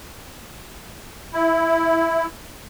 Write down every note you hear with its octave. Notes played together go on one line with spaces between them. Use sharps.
E4